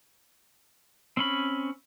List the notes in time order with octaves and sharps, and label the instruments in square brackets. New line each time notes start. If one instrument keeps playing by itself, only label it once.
[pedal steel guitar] C4 C#4 B5